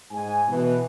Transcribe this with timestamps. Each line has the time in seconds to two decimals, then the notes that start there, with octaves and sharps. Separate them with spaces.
0.11 G#2 G#5
0.48 B2 E3